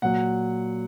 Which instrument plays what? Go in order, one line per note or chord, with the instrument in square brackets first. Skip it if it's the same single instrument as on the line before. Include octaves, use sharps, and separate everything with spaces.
[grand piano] A#2 F#3 F#5